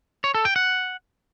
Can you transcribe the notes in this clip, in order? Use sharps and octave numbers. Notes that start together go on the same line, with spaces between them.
C#5
A4
G5
F#5